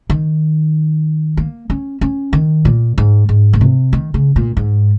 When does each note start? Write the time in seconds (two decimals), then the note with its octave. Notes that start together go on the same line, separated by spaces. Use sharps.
0.10 D#3
1.37 A#3
1.70 C#4
2.01 C#4
2.33 D#3
2.65 A#2
2.98 G#2
3.29 G#2
3.53 A#2
3.61 C3
3.93 D#3
4.14 C#3
4.36 A#2
4.57 G#2